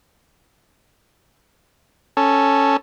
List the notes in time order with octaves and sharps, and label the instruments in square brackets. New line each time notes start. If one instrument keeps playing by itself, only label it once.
[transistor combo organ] C#4 A4